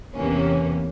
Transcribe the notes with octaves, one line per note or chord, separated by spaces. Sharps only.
E2 C3 E3 A#3 C#4